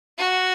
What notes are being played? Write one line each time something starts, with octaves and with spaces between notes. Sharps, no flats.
F#4